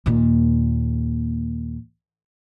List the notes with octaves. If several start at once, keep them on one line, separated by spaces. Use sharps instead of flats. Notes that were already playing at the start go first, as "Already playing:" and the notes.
D#2 A#2